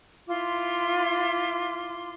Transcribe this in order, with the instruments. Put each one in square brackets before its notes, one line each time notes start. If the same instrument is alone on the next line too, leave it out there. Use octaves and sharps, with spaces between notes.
[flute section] E4 F4 C6 D6